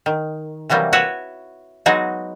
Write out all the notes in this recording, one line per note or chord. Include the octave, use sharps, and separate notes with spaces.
D#3
C3 E3 F#3 G3 A#3
E4 F#4 B4 C#5 E5 F#5
F#3 G#3 B3 D#4 F#4 G#4